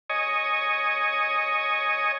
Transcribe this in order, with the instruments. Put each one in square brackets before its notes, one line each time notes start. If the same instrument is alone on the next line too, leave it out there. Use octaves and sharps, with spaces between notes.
[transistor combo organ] C#5 D#5 G#5